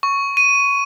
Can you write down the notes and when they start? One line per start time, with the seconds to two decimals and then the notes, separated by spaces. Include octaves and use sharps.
0.03 C#6
0.37 D#7